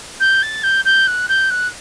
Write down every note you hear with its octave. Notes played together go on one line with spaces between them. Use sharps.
G6
A6
G6
G6
F#6
G6
F#6